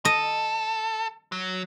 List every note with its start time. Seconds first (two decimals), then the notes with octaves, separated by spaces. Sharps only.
0.05 A4 D#5
1.32 F#3